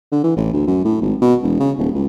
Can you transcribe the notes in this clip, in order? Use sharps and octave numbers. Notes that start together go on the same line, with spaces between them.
D3
E3
A1
D2
F#2
A2
G#1
B2
E1
C#3
D#1
C#2